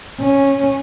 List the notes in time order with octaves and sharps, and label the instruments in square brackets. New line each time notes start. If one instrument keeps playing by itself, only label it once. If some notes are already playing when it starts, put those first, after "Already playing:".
[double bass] C#4